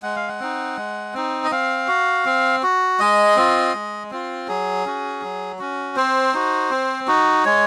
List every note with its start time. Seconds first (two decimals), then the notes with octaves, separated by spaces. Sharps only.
0.03 G#3 F#5
0.16 F5
0.28 F#5
0.40 C4 D#4
0.77 G#3
1.14 C4 D#4
1.44 D#5
1.51 C4 F5
1.88 F#4
2.25 C4
2.63 F#4
2.99 G#3 D#5
3.37 C4 F4
3.74 G#3
4.11 C4 F4
4.48 F#3 G#4
4.86 C#4 F#4
5.22 F#3
5.59 C#4 F#4
5.96 C4 C5
6.34 D#4 F#4
6.71 C4
7.08 D#4 F#4
7.45 G#3 C#5